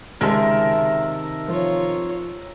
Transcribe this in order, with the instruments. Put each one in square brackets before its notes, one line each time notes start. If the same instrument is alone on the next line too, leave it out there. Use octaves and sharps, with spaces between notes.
[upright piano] C#2 G#3 [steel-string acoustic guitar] C3 D#3 [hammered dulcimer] A#4 E5 A5
[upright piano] F3 [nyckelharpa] F4 C#5